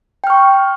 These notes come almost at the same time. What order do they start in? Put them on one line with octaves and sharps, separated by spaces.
G5 F6 C#6